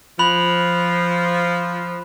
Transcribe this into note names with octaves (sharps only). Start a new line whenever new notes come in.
F3 B5 F#6 F7